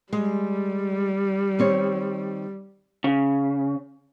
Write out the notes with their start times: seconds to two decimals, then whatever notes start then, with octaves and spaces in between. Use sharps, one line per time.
0.13 G3 G#3
1.59 D#3 C4 C#5
3.04 C#3